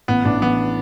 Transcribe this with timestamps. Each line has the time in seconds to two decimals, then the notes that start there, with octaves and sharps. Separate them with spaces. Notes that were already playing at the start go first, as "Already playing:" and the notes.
0.08 A1 B3
0.25 A1 D4
0.41 E3 B3